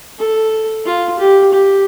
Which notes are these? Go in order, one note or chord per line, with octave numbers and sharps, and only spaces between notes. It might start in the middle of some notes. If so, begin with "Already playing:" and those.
A4
F4
G4
G4